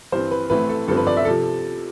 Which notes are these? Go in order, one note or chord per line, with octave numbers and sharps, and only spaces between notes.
G2 E3 G3 C4 C5
B4
A1 A2 E3 A3 C4 B4
A4
G1 G2 F3 C4 A4
B4
D5
E5
C3 F3 A4